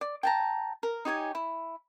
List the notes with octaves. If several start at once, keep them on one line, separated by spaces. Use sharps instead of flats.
D5
G5 A5 A#5
A#4
D#4 G4 C#5 G#5
E4